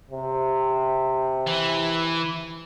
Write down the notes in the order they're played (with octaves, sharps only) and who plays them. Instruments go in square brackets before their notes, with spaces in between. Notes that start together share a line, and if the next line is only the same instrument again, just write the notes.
[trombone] C3
[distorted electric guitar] E3